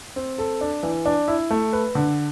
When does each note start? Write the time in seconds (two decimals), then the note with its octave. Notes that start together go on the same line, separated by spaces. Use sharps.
0.16 C4
0.38 A4
0.61 D4
0.83 E3
1.05 D4
1.28 E4
1.50 A3
1.73 B4
1.95 D3